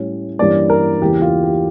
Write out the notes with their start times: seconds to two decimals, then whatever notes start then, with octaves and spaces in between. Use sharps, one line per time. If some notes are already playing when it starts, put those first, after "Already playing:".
Already playing: A2 G3 C#4
0.39 G2 E3 G3 A#3 C#4 D5
0.70 A#4
1.01 E2 C#3 E3 A#3 G4
1.22 F4
1.43 G4